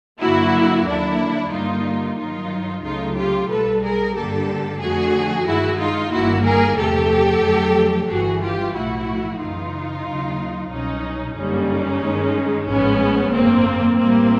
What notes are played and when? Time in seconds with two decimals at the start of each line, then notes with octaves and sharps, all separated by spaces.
0.21 G2 D3 F#3 A#3 E4 F#4
0.87 D#2 D3 F#3 A#3 D4 E4
1.52 G2 D3 G3 A#3 D#4 F4
2.17 G2 D#3 F#3 D#4 F4
2.83 C#2 C#3 F#3 A3 D#4 F4
3.16 F4 G4
3.49 B1 B2 G3 A4 B4
3.82 G#4 A#4
4.15 G2 D3 G3 A#3 G4 A4
4.80 F2 D3 F3 A3 F#4 G#4
5.46 G2 D#3 G#3 E4 F#4
5.79 D#4 F4
6.12 G1 G2 D#3 G3 A#3 E4 F#4
6.45 G#4 A#4
6.77 E2 C3 F3 A3 G4 A4
7.43 F2 D3 F#3 A3
8.08 G1 G2 E3 G3 F#4 G#4
8.41 F4 G4
8.74 B1 A2 F3 A3 E4 F#4
9.40 F#2 C#3 E3 D#4 F4
10.05 D#2 C#3 F#3
10.71 C2 B2 F#3 C#4 D#4
11.37 G1 F#2 D3 G3 A#3 C#4 D#4
12.03 G2 D#3 G#3
12.68 A1 G#2 F3 G#3 B3 C#4
13.34 G#1 F#2 D3 A#3 C4
13.99 A1 A2 E3 G3 A#3 C4